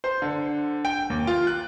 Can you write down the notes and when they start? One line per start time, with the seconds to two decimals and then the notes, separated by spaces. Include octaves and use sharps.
0.04 C5
0.22 D3
0.85 G5
1.10 D#2
1.27 F4
1.47 F#6